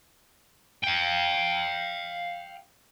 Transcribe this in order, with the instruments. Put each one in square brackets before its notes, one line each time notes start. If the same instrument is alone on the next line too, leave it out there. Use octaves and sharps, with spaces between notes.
[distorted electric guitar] F5 G5